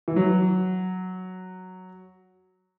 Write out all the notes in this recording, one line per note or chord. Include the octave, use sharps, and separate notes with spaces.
E3
F#3